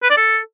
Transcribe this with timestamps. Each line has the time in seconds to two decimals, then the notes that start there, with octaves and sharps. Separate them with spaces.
0.03 B4
0.10 D5
0.17 A4